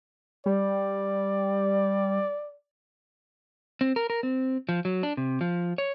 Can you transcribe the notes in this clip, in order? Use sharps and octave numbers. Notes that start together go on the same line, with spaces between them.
G3 D5
C4
A#4
A#4
C4
F3
F#3
D4
C3
F3
C#5